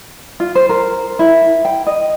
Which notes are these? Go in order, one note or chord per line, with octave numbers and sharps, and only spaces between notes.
F4
C5
A#4
E4
G5
D#5